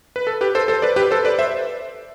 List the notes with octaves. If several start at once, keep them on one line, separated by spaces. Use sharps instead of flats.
B4
A4
G4 B4
A4 C5
A4 C5
B4 D5
G4 B4
A4 C5
B4 D5
C5 E5